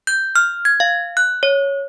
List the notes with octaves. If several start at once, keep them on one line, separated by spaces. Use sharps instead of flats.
G6
F6
G#6
F5
F#6
C#5